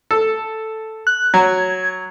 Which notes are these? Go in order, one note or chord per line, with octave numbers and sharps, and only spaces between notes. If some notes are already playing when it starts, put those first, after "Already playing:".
A4
F#6
F#3 G#6